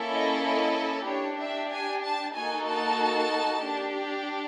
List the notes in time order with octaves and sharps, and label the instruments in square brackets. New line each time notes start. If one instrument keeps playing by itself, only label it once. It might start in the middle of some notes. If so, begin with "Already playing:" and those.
Already playing: [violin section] A#3 C#4 E4 A4
D#5
D#5
D4 G4 C#5
E5
G#5
A5
A#3 D#4 F#4 A4 G#5
A5
D4 G4